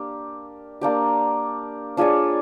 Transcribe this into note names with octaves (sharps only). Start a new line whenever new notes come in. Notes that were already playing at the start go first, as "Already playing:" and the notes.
Already playing: A#3 D4 G4
A#3 D4 G4
D4 F4 G#4 C#5